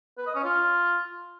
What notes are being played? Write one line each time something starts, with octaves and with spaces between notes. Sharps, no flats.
B4
D#5
C#4
F4